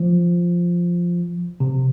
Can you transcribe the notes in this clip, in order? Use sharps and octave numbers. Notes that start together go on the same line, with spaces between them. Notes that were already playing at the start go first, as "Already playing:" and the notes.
Already playing: F3
C3